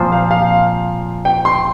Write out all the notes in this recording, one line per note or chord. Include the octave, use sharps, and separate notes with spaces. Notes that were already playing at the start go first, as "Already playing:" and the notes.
Already playing: A#2 F3 C4 F4 C5
F5
F5
G5
C6